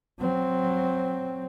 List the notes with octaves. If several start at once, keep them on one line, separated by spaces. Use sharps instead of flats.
F#3 C4